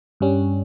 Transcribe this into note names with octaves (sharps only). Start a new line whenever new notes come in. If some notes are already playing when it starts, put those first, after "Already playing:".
G2 G3 C#4